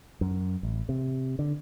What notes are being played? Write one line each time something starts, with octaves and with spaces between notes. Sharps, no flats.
F#2
A1
C3
D3